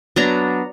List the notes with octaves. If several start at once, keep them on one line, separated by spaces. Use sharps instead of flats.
F#3 B3 D4 A#5